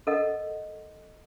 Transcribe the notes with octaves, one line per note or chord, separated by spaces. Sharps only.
A4 A#4 D#5 F#5